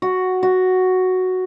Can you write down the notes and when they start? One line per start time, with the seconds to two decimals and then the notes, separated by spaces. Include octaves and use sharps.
0.02 F#4
0.43 F#4